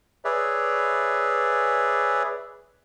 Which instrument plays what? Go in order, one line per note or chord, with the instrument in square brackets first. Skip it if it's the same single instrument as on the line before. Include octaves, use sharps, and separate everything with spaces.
[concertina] G#4 B4 C#5 D5 E5